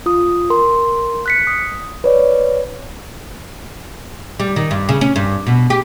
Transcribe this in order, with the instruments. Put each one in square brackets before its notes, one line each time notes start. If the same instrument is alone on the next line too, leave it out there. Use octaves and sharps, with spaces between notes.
[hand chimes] F4 D#6
A#4 C6
F#6 B6 C#7
D#6
B4 C#5 D5
[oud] G3
D#3
G2
C#3
C#4
G2
B2
G4